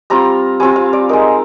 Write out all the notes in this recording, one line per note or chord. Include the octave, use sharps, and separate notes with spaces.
G3 C4 F4 A#5
G3 C4 F4 G#5
F5
D5
G#3 D#4 A#4